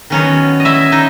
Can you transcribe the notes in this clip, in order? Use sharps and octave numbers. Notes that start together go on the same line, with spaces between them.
D#3 F#3 B3 C#4 C#5
D#5
E4 E5
D#4 D#5